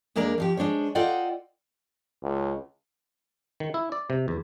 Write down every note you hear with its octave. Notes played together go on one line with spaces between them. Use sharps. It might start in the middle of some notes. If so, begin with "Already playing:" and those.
E2 G#3 A#3 D4 A#4 D5
F2 F3 G4
G#3 D4 C5 C#5
F4 A4 D5 D#5 F#5 G5
C#2
D#3
E4
D5
C3
E2